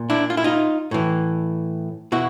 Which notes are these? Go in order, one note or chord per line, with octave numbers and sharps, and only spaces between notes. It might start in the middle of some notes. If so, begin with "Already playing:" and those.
Already playing: A#2
D4 E4
F4
E4
D#4 F4
A2 E3
B2 E4 F#4